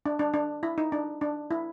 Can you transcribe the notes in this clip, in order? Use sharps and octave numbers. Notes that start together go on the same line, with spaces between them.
D4
D4
D4
E4
D#4
D4
D4
E4